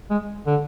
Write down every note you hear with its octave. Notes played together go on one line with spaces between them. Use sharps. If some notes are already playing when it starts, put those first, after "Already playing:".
G#3
D3